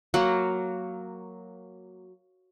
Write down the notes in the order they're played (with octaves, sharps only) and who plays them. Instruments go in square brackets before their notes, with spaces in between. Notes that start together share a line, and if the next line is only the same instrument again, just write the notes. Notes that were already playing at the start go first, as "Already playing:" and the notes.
[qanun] F#3 A#3 F#5